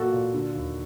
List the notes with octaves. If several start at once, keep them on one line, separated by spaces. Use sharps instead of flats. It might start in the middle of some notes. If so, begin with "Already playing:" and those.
Already playing: A#2 F#3 A#3 F#4 A4
A#2
D3
D#2